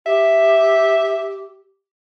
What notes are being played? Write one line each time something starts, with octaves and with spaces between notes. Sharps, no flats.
G4 E5